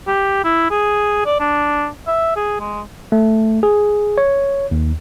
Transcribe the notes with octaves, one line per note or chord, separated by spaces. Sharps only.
G4
E4
G#4
D5
D4
E5
G#4
G#3
A3
G#4
C#5
D#2